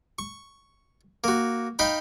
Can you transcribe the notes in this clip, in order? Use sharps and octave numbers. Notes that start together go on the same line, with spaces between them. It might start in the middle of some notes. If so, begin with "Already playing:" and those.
C#6
A#3 F#4
D#4 F5 G5 B5